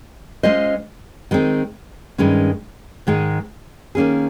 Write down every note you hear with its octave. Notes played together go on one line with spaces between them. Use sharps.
G#3 C#4 F4 C5 D#5
D#3 G#3 C4
G2 D#3 G#3 C#4
G#2 D#3 G#3 D#4
D#3 A#3 C#4 G#4